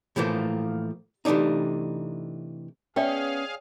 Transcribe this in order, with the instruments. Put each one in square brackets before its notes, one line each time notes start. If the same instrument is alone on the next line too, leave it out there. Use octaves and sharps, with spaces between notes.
[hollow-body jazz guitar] A2 E3 F3 A3 A#3
C3 E3 A3 D4 D#4
[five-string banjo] B3 E5 [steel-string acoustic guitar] C#4 [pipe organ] G#4 F5 [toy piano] D5 G5